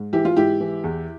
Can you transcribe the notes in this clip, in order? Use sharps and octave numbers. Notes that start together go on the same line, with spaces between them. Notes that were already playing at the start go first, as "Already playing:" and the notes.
Already playing: G#2
E3 E4 G4
F4
G#2 E4 G4
E3
E2